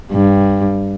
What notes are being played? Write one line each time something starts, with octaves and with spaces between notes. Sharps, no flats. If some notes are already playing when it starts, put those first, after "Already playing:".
G2